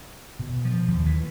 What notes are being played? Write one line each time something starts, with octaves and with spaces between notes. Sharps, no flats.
B2
F3
D#2
E3